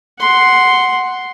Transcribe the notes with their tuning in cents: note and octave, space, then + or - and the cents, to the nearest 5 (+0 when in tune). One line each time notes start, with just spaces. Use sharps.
F#5 +0 C6 +0